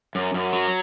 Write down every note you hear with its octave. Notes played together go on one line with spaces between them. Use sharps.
F#2
F#2
F#3